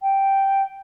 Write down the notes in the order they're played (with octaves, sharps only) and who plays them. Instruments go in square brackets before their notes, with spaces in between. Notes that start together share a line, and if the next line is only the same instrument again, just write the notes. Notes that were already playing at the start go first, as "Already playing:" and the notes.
[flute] G5